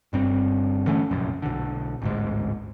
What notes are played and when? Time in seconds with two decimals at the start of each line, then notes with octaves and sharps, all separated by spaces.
0.13 G1 G2 C4
0.87 D3 E3 A3 C#4
1.11 F1 A#1 F#2
1.42 B1 D3
2.02 A1 D2 G#2